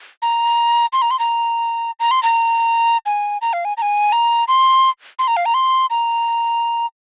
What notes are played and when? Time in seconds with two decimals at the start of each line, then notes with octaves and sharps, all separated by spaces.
0.22 A#5
0.93 C6
1.02 A#5
1.11 C6
1.19 A#5
2.00 A#5
2.11 C6
2.23 A#5
3.06 G#5
3.42 A#5
3.53 F5
3.65 G#5
3.77 A#5
3.82 G#5
4.12 A#5
4.48 C6
5.19 C6
5.27 A#5
5.37 F5
5.46 A#5
5.54 C6
5.90 A#5